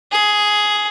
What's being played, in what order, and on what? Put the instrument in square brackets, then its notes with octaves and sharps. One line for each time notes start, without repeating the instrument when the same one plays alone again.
[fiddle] G#4